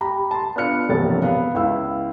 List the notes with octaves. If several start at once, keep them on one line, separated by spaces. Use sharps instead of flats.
G4 A#5 B5
A5 C6
B3 D4 F4 F6 C#7
E1 A#1 G2 C3 C#5 A6
B3 F5
C#2 E4 F5 E6